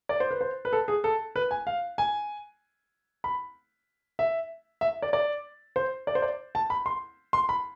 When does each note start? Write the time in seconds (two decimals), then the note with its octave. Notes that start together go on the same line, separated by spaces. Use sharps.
0.09 D5
0.20 C5
0.31 B4
0.41 C5
0.65 B4
0.73 A4
0.88 G#4
1.04 A4
1.36 B4
1.51 G#5
1.67 F5
1.98 G#5
3.24 B5
4.19 E5
4.81 E5
5.02 D5
5.13 D5
5.76 C5
6.07 D5
6.15 C5
6.22 D5
6.55 A5
6.70 B5
6.86 C6
7.33 C6
7.49 B5